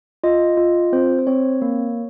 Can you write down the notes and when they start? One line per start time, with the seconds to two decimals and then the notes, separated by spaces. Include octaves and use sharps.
0.24 F4 D#5
0.57 F4
0.93 C4 C5
1.19 C5
1.27 C4 C#5
1.62 A#3